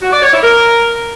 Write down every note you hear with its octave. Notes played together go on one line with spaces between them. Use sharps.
F#4
D5
C#5
E4
A#4